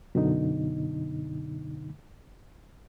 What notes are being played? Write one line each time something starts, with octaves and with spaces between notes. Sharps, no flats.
F#2 B2 D3 D#4